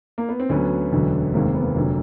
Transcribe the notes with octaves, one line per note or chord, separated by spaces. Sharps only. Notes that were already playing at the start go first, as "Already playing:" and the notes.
A#3
B3
C4
D2 D3 F#3 B3 C#4
E1 D2 D3 F#3
F1 D#2 D#3 G#3 A#3 C4
C4
B3
A#3
F1 D3 F#3